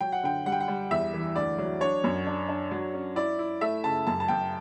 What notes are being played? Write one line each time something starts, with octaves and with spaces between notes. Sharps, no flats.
F#3 G5
F#5
D3 G5
G3 F#5
G5
F#5
G3
E2 E5
E3
D2 D5
F#3
D4 C#5
F#2
D4
D4
F#3
C#4
E4 D5
E4
A3 E5
C#3 A5
F#2 A5
A5
F#2 G5